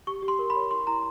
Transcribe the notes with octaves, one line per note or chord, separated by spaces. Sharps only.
G4 C#6
G4
C6
A#4
B5
C#5
E4 C6
E4 A#5